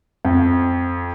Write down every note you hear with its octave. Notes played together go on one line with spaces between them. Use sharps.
F2